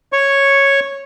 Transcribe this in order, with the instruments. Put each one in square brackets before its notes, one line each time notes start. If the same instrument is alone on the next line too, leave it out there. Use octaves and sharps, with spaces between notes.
[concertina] C#5 C#6